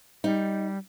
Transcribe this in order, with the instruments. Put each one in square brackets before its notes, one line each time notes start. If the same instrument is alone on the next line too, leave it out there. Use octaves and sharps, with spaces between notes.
[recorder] G3 [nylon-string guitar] D#4